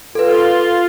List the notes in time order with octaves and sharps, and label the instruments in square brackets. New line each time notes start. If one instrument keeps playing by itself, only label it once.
[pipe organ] F4 [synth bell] A4 B4